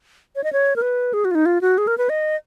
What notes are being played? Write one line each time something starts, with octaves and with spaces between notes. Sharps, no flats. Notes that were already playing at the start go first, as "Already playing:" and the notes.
C#5
D#5
C#5
A#4
B4
G#4
F#4
F4
D#4
F4
F#4
G#4
A#4
B4
D#5